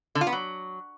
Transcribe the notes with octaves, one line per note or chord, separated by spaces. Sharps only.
D3
F4
B3
F#3